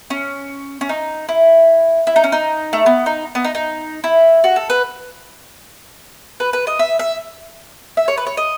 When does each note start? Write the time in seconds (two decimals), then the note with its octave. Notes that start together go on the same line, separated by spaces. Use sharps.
0.10 C#4
0.81 C#4
0.89 D#4
1.29 E4
2.07 E4
2.16 D#4
2.24 C#4
2.32 D#4
2.73 A3
2.86 B3
3.06 D#4
3.35 B3
3.44 D#4
3.55 D#4
4.04 E4
4.44 F#4
4.56 A4
4.70 B4
6.40 B4
6.53 B4
6.67 D#5
6.79 E5
6.99 E5
7.97 E5
8.08 C#5
8.17 B4
8.26 C#5
8.37 D#5